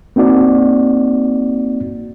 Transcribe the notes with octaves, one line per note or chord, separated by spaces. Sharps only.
A#3 C4 D#4 F#4 D5